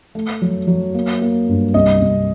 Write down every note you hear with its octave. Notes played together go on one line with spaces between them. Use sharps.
A3
F#3
F#3
A#3
A#3
G2
C2 D#5
C2